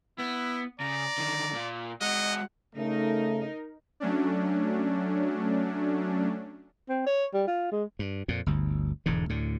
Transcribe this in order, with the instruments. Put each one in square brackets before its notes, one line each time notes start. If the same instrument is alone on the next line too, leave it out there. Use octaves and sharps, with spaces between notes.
[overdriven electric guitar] B3 [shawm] E4
[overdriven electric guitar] C#3 [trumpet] D5 [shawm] A#5
[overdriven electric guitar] D3 D#3
A#2 A#3
[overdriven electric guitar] G#3 F#4 [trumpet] D#5 [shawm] F#5
[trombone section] C#3 A3 [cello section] D#4 A#4
[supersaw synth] F#3 A3 C#4 D4
[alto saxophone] C4
C#5
G3
F4
G#3
[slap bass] G2
F2 A#2
G1 D2
E1 E2 G#2 D3
D2 A2 D3